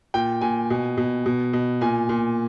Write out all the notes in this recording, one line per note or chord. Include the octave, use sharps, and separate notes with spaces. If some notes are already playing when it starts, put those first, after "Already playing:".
A#2 G5
A#2 G#5
B2
B2
B2
B2
A#2 G#5
A#2